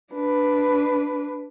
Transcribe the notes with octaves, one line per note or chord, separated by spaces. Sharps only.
D4 B4